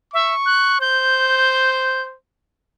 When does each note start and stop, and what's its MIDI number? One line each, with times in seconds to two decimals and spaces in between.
0.14 0.34 76
0.14 0.76 85
0.46 0.81 90
0.81 2.16 72
0.81 2.02 91